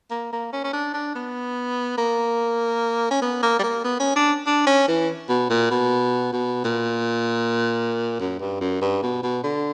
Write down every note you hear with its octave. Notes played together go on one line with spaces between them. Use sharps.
A#3
A#3
C#4
C#4
D4
D4
B3
A#3
C#4
B3
A#3
G3
A#3
B3
C#4
D4
D4
C#4
E3
B2
A#2
B2
B2
A#2
F#2
G2
F#2
G2
B2
B2
D3